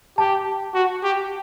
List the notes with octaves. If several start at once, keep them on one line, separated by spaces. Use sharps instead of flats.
G4 A5
F#4
G4